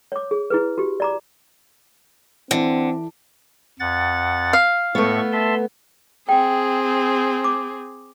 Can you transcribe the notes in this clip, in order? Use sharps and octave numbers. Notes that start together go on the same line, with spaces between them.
C#5 D6
G#4
E4 G#4 B4
F#4 G4
D5 A#5 D6
D3 E3 C4
F2 F#5 A6
F5
A2 A3 B3 C#6
E5 A5 C6
C4 G#4 G5
D6